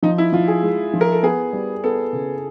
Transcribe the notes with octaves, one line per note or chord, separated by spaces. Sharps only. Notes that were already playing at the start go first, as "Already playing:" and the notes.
F3 D#4
E4
F3 F4
G#4
G#3
F3
A#4
A4
B3 G#4
G3
B3 A4
C#3